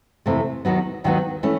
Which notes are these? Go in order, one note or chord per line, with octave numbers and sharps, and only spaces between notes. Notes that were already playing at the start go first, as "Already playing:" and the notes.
F2 C3 E3 A3
D#2 D#3 F#3 B3
D#2 D#3 F#3 B3
E3 A3 C#4